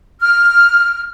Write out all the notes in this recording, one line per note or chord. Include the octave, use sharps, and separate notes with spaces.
F6